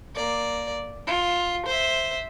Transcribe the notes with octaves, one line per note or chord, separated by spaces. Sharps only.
A#3 D5
F4
C5 E5